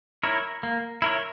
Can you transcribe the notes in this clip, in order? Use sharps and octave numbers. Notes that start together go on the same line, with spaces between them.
E4 A#4 C#5
A#3
E4 A#4 C#5